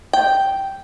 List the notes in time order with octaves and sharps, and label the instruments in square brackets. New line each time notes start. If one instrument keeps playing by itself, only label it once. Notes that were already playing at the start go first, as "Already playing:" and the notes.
[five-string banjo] G5